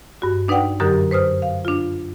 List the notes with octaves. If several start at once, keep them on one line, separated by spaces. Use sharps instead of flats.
G2 F#4
D4 D#4 B4 D5 F#5 G5
F#2 D3 F#3 G4 A#4 D#6
B4 C5 D#6 F6
F5
D4 F4